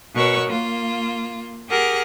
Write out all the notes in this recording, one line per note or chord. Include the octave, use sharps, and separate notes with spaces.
B2 A#4 C#5 F#5 C#6 E6
A#3 F4
G4 G#4 A#4 F#5 F6